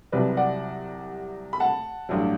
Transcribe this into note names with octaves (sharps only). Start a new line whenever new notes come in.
C2 C3 F#3 B4 D5
D5 F#5
B5
F#5 A5
A1 G2 F#3